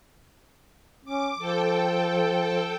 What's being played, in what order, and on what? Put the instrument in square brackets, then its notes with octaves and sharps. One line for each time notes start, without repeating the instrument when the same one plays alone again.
[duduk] C#4 [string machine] D6
[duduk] F3 [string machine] A4 G5